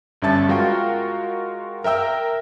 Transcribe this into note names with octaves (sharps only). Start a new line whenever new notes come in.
G1 G2 C#4 E5 A5 A6
G#3 F4 F#4 A#4 F5 G5
A#4 E5 G5 E6